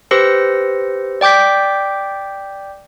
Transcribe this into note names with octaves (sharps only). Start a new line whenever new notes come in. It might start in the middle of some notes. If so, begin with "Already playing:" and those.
G4 B4 C5 E6 A#6 C#7
D5 G5 D6 G6 B6